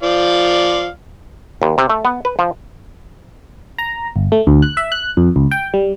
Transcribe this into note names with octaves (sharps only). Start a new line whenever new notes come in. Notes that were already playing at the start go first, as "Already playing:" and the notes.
F3 D5 F5
D#2
C3
A3
B3
B4
F3
A#5
G1
A3
D2
F#6
E5
F#6
F2
C#2
G5
G3